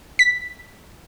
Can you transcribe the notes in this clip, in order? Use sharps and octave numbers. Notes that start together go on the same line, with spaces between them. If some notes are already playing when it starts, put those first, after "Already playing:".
B6